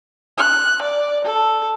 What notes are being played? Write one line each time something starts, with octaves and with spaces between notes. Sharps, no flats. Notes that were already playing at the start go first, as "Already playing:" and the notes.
F#6
D5
A4